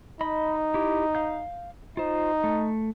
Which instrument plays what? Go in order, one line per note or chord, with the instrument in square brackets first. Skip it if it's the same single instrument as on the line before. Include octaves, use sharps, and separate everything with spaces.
[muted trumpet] D#4 [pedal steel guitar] D#5 B5
[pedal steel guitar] E4 G4
F5 G6
[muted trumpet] D#4 [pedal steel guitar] F4 C5
[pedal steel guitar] A3